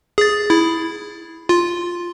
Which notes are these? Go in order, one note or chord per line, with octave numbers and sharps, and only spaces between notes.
G#4 A6
E4
F4